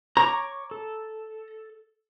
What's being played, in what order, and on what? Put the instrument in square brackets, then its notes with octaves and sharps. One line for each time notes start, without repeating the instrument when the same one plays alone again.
[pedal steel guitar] C#5 C#6 D6 [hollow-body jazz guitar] A#5
[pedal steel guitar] A4